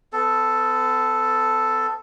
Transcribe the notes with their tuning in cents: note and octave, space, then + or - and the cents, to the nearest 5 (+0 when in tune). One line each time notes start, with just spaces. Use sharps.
B3 +40 A4 +0